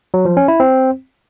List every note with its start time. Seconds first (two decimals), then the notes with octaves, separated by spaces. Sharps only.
0.14 F#3
0.25 F3
0.37 C#4
0.48 E4
0.60 C4